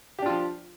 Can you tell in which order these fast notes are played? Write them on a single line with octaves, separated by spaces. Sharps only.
G4 D4 F4 F3